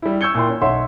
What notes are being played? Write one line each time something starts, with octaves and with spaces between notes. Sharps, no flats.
G3 E4
C#6 E6 G6 G#6 C#7 G7
A#2 E4 G5 C6
C#4
B1 C#5 E5 F#5 C6